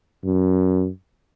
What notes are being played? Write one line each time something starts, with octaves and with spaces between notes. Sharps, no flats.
F#2